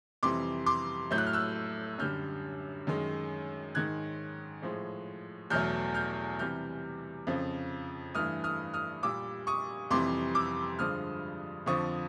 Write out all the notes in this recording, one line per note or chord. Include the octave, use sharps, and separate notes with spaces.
F2 C3 E3 G3 C6 D6
C6 D6
A2 F#3 A3 G6
F#6
F6
E6 F#6
F#2 D3 G3 F6 G6
F#2 D#3 G#3
G#2 D#3 G#3 F#6 G#6
A2 F3 G#3
E2 B2 F#3 A3 F6 G6
F6 G6
C3 E3 G3 F6 G6
F2 C#3 F3
G2 E3 A3 D#6 F6
D#6 F6
D#6 F6
A#2 G3 D6 E6
C#6 D#6
F2 C3 E3 G3 C6 D6
D6 E6
G2 D3 F3 G#3 D#6 F6
F2 D3 F3 C#6 D#6